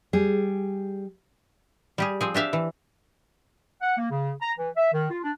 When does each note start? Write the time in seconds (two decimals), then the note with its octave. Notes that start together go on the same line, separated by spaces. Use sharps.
0.13 G3 G#4
1.98 G3 G4 G#4
2.21 F3 C4 G#4
2.34 D4 G4 E5 F5
2.53 E3
3.81 F#5
3.97 A#3
4.10 C#3
4.41 A#5
4.57 E3
4.76 E5
4.92 D#3
5.10 F4
5.23 D4